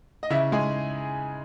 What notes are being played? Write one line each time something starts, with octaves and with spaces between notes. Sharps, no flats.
D#5
C#3 E4 E5
G#3 D#4 G#4 G#5